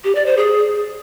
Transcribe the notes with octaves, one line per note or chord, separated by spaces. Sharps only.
G4
D5
C5
G#4